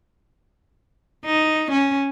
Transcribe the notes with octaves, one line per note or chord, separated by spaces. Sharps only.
D#4
C#4